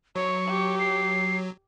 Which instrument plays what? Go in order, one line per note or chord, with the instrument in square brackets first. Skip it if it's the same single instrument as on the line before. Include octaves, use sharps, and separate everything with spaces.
[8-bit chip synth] F#3 [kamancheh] C#5 [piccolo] C#6
[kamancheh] G4
[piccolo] C7